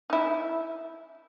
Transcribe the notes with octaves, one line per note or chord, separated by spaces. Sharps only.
D#4 E4